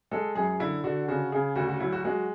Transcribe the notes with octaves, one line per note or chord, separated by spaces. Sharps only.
G#3 A4
F#2 G#4
D3 E4
D3 F#4
C#3 F#4
C#3 G#4
D2 F#4
F#4
F#3 E4
F#4
G#3 F#4